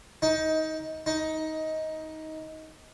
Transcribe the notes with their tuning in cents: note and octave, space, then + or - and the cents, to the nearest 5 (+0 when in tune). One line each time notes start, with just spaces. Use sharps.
D#4 +20
D#4 +15